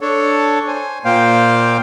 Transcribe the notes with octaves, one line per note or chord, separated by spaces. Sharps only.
D4 A4 C#5
C5 G#5
A#2 A#3 C5 F5 G5